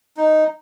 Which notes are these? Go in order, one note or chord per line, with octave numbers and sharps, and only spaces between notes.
D#4